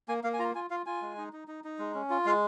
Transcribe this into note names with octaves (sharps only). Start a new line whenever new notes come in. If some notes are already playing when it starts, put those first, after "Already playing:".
A#3 G#5
A#3 F5
G#5
F4 A#5
F4 G#5
F4 F5
F4 G#5
G#3
D#4
D#4
D#4
D#4
G#3
C#4
F4
G#3 F5